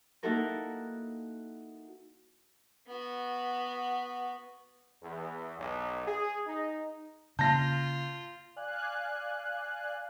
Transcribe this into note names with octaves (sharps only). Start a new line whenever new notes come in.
A#3 D#4 E4 F#4 A4 A#4
B3 F#4
E2
B1
G#4
D#4
C#3 A#3 F4 A5 G6 A#6
D5 F5 G#5 F#6